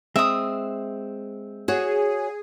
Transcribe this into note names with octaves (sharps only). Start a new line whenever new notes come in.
G#3 C4 E5 D#6
F#4 G#4 C#5